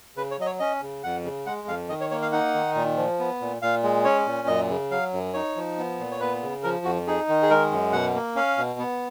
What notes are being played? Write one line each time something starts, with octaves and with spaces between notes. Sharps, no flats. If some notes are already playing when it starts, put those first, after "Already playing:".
C#3 B4
C#5
F#3 D#5
C#5
C#4 D#5
C#3
F2 F#5
C#3
G#3 F#5
F2 F5
D#3 D#5
C#5
A#3 C#5
F5
D#4 F#5
D#3
A#2
F3
B3
A#2
A#2 F5
G#3
C#4 C#5
A#2
F#2 D#5
C#3
F#3 F5
F#2
D#4 C#5
F3
B3
A#2
C#5
B3 B4
C#3
F3 A#4
F2 F#4
D#4 G#4
D#3
G#4
G#3 A#4
F#2
B2 F#5
A#3
C#4 F5
B2
B3